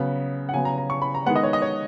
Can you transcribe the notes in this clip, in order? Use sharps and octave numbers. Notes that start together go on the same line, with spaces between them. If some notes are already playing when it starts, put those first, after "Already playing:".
Already playing: C#3 F#3 B3
F#5
C#3 F#3 B3 G#5
A#5
A#5
C#6
B5
A#5
D#3 G#3 B3 F#5
D#5
C#5
D#5
C#5